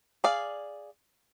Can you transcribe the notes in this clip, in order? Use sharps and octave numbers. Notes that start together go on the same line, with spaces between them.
G#4 D5 F5